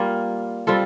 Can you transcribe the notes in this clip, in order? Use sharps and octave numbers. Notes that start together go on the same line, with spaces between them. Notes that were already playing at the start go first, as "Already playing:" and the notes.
Already playing: G3 A#3 F4
G3 C4 F4 A4